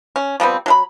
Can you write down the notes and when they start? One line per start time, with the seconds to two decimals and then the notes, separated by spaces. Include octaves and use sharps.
0.16 C#4
0.40 F3 G3 B3 C4
0.66 F#3 A4 B5